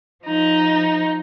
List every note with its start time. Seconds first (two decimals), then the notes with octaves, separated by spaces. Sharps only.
0.24 F3 D#4